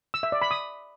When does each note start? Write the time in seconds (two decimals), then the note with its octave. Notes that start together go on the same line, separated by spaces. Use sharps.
0.14 E6
0.23 E5
0.32 D5
0.42 B5
0.51 D#6